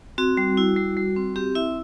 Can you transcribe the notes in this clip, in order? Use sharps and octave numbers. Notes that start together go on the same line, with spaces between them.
C4 F#4
G3
E4
G3
G3
C4
C4 G4
E4 E5